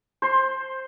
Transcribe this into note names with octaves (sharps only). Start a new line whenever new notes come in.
C5 C6